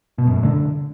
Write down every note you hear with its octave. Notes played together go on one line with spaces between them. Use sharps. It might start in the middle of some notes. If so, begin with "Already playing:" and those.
B2
F#2
A2
D3